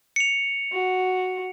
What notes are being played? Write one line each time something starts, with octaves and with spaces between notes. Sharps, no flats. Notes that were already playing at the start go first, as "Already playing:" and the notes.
C#7 F7
F#4